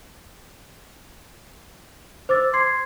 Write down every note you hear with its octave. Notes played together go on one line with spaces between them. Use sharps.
C5 D6 E6 A6
C6 G#6 C7